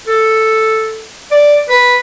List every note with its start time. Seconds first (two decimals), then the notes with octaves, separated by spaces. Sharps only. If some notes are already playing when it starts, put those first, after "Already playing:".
0.08 A4
1.32 D5
1.69 B4